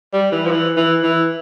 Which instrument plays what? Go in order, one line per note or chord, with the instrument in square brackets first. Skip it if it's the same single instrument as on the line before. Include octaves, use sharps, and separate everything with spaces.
[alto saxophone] G3
E3
F3
E3
E3
E3